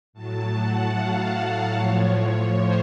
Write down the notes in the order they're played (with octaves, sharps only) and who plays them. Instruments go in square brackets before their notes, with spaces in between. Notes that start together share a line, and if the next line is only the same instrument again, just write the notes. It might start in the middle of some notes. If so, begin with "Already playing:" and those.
[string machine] A2 F#3 A5
F#5
F5
A2 F3 C#5
C5